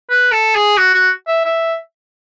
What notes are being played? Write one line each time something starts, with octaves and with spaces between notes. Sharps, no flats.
B4
A4
G#4
F#4
F#4
E5
E5